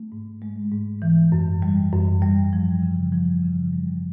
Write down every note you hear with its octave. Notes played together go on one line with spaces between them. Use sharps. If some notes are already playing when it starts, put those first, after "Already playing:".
Already playing: A3
G#2
G#3
G#2
E3
F#2
G3
F#2
G3
F3
C#3
F3
C#3
G3